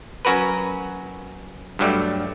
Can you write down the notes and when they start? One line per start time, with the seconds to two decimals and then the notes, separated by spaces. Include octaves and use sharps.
0.25 F#3 C#4 F#4 A#4 B4
1.79 G2 F#3 G3 A3